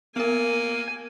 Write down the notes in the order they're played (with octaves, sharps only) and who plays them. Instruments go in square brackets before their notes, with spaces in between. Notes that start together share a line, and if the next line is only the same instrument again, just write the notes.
[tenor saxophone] A#3 [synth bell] B3 A#4 [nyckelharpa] G#5